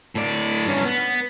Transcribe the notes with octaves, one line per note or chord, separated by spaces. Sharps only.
A2 D5
G2 C#4
B3